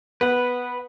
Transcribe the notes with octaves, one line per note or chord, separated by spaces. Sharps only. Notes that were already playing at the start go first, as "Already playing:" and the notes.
B3 B4 F#5